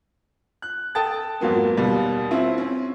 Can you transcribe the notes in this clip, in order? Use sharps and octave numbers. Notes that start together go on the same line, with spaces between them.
F#6
A4 G5 A5 D#6 A6
F2 G#2 F#3 A#3 B3
D#2 B2 G3
C4 C#4 E4 F4
C4 C#4